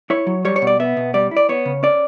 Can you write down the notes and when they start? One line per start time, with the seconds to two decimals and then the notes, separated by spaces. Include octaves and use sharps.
0.10 E4 C#5
0.27 F#3
0.45 G3 C#5
0.56 C#5
0.62 B2
0.67 D5
0.80 B3 E5
0.97 B2
1.14 G3 D5
1.31 E4
1.37 D5
1.49 B3 C#5
1.66 C#3
1.83 C#4 D5